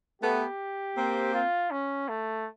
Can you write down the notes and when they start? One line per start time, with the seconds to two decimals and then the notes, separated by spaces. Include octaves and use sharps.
0.22 A3 B3 G4
0.97 A#3 C4
1.34 F4
1.71 C#4
2.09 A3